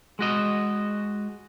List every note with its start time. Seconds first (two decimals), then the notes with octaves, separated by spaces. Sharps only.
0.19 G#3 F#4 D#5